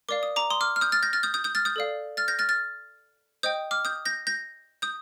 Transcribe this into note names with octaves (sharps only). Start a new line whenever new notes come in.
A#4 D5 F5 D6
D#6
A#5 D6
C6 D#6
D6 F6
F6
D#6 G6
F6 A6
G6 A#6
F6 A6
D#6 G6
D#6 G6
D#6 G6
F6 A6
D#6 G6
A4 D5 F5
F6 A6
G6 A#6
F6 A6
F6 A6
C5 D#5 G5 D#6 G6
D6 F6
D#6 G6
G6 A#6
G6 A#6
D#6 G6